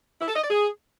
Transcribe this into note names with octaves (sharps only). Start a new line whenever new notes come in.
E4
A4
D#5
D5
G#4